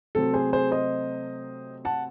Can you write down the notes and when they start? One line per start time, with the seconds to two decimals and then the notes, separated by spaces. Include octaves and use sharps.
0.15 C3 F#3 A3 C4 A4
0.34 G#4 C5
0.53 G#4 C5
0.72 C5 D#5
1.85 F#5 A5